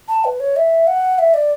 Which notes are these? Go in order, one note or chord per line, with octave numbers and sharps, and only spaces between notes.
A5
B4
C#5
E5
F#5
E5
D5